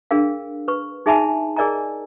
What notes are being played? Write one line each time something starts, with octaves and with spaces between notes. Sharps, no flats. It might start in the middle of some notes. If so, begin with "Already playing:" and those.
D4 G#4 A#4 F5
B4 C#6
D#4 G#4 E5 G#5 A5 B5
G#4 A#4 D5 D#5 G#5 A#5